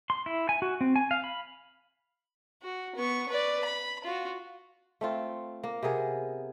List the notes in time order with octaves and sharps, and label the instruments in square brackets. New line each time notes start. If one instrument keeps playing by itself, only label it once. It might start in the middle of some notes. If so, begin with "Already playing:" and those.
[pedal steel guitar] C6
E4
G#5
F#4
C4
G#5
F5
B5
[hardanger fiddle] F#4
B3 C#6
B4 D5
B5
F4 F#4
[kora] A3 C4 F4
A#3
C3 B3 G#4 A#4